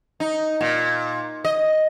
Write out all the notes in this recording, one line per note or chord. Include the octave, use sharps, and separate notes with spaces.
D#4
A#2
D#5